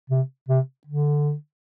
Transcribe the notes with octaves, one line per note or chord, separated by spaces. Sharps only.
C3
C3
D3